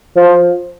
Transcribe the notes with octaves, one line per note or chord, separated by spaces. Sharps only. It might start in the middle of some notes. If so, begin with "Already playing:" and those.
F3